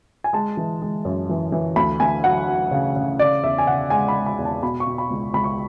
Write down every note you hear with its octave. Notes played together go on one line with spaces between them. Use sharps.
G#5
G#3 A5
E3
G#3
F#2
E3
E3
D2 B5
D2 G#5
F#3 F#5
F#3
C#3
C#3
C#3 D5
E2 E5
G#5
C#3 F#5
G#3 G#5
B5
G#3
B5
E2
A5
B2 B5
C#6
B2
B5
C#2
C#2 B5
C#6